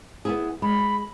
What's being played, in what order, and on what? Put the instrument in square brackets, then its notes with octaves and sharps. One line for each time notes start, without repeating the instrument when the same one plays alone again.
[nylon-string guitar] B3 E4 G#4
[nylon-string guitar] G#3 [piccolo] B5